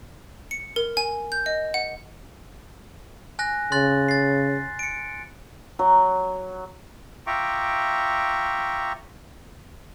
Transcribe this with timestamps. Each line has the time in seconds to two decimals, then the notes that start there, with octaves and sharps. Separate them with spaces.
0.51 C#7
0.76 A#4
0.97 G#5
1.32 G6
1.46 D#5
1.74 F#5
3.39 G#5 F#6 A#6
3.72 C#3 C6 F#6 A6
4.09 A6 C7
4.79 C#7 D7
5.79 F#3
7.27 F4 E5 G5 A#5 C#6 D6